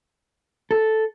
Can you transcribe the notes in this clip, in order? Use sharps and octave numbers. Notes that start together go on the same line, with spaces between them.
A4